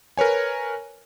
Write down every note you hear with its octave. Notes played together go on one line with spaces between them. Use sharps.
A#4 B4 C#5 G#5